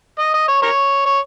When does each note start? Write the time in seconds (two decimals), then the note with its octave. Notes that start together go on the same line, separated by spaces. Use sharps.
0.19 D#5
0.34 D#5
0.48 C#5
0.62 A#4 C#5
1.06 C#5